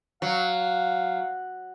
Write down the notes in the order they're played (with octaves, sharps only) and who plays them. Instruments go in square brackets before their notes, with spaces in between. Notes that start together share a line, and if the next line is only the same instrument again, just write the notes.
[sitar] F#3 [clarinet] F5